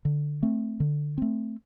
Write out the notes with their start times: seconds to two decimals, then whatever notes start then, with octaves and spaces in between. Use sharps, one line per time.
0.05 D3
0.43 A3 C4
0.80 D3
1.18 A3 C4